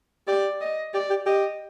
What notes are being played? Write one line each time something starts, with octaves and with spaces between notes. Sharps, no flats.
G4 D5
D#5
G4 D5
G4
G4 D#5